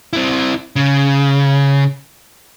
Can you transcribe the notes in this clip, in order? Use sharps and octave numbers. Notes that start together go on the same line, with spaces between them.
C4 E4
C#3